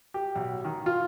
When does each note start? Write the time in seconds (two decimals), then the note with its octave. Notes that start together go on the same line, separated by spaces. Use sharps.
0.14 G4
0.35 B1
0.64 D#3
0.86 F4